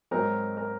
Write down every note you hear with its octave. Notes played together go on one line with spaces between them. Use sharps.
G#2 F#3 C4 D#4 A#4
A#4